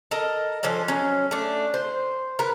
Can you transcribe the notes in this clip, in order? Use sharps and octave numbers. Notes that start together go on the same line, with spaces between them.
A4 A#4 D#5
F3 C#4 D4 A4
F#3 C#4
A3 D4
C5
A#4 B4